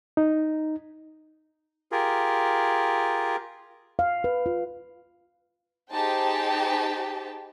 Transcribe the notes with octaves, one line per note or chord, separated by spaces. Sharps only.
D#4
F4 G4 G#4 A#4
F5
B4
F4
D#4 G4 G#4 C5 G5 A5